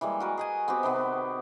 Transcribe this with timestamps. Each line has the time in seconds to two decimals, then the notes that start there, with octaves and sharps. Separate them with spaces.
0.01 E3 G3 G#3 A#3
0.20 F#4 A#4 B4
0.37 G#4 D#5 G#5
0.68 B3 C4 F#4 G4
0.83 C3 D#3 B3